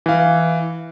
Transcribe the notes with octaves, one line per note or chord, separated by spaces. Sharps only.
E3 F5